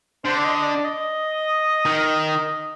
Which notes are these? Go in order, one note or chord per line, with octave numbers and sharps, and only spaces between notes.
D3 C5
D5
D#5
D#5
D5
D#5
D#3